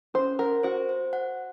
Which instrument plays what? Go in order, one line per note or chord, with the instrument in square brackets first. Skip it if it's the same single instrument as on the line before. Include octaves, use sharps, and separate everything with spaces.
[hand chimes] C#4 [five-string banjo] C5
[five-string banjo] A#4 [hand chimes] F#5
[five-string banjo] F#4 [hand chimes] C5
[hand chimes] C5
F#5